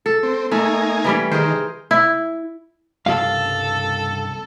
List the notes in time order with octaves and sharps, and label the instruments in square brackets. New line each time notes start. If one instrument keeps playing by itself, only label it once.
[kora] A4
[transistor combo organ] C4
[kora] A3 [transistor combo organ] A#3 D#4 G#5
[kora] E3 G3 C#4
[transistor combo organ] D#3 [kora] G#4 A#4 C5
[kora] E4
[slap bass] C2 C#3 A#3 [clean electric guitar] G2 F5 [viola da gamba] A4